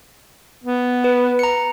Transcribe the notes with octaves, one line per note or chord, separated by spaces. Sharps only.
B3
B4
A#5 C#7